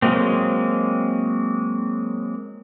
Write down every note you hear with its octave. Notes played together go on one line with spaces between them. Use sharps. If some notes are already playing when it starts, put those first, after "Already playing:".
F#3 G#3 A#3 C4